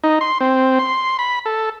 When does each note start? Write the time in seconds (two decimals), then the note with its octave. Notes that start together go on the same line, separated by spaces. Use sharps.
0.03 D#4
0.21 C6
0.40 C4
0.79 C6
1.19 B5
1.46 A4